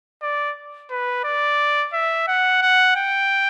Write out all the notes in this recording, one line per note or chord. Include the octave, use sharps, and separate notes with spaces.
D5
B4
D5
E5
F#5
F#5
G5